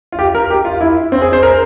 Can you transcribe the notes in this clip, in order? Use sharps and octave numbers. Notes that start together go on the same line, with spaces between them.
F4
G4
A#4
G4
F4
E4
C4
G#4
C5
A#4